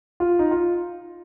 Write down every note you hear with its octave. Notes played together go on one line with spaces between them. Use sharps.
F4
D#4
F4